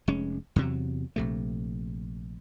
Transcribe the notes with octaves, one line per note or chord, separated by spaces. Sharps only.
F1 G#3 C#4
E2 C3 F#3
A#1 C3 A3